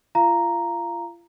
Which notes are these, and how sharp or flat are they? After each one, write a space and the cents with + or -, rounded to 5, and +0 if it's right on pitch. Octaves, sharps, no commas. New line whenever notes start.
F4 -35 F5 -20 A#5 +0